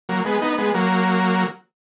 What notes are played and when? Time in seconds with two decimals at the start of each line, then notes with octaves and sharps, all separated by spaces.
0.09 F#3 A#3
0.25 G#3 B3
0.42 B3 D#4
0.58 G#3 B3
0.74 F#3 A#3